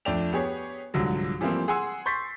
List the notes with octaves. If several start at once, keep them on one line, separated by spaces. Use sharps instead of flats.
F2 A3 D4 D5 G5 F7
B3 G4 G#4 C#5
C2 G#2 D3 F3 F#3
E3 F3 G3 A3 A#3 C4
G#4 F#5 G#5 C6 E6
C6 C#6 G6 A6 B6 C7